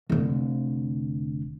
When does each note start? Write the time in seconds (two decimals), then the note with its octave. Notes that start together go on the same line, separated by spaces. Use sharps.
0.10 F1 D3